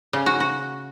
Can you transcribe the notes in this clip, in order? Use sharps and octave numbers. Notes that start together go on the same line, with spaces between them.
C#3
F#4
F#4